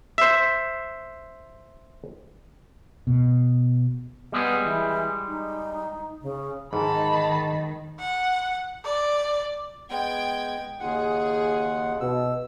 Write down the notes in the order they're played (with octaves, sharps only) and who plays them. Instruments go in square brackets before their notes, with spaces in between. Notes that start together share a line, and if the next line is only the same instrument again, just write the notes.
[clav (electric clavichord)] C5 E5
[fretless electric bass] B2
[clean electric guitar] G3 G#3 G#4 [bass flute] B3
[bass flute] E3
D#4
C#3
[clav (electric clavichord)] G#2 [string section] D#3 [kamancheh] A5 B5
[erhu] F#5
D5
[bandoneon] G#3 B3 [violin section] G5 G#6
[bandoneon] D#2 F#5 [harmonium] C#3 D#4 F4 [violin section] G#4
[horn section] B2 [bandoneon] E6